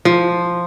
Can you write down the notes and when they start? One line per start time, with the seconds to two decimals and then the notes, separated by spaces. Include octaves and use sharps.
0.05 F3